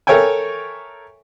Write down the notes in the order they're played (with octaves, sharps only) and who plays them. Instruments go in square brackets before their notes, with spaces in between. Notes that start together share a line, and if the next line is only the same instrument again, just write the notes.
[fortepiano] A4 A#4 C#5 E5 G5 G#5